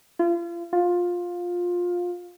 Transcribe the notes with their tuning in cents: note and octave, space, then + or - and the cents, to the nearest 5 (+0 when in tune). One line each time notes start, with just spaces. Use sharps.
F4 -35
F4 +15